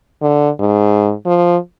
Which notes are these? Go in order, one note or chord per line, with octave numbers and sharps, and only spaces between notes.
D3
G#2
F3